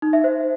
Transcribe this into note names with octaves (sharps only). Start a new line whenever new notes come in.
D#4
E5
C5